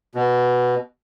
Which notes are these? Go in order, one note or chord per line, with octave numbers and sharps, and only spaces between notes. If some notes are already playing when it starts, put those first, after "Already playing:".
B2